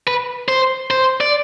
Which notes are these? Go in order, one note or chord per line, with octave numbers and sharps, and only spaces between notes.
B4
C5
C5
D5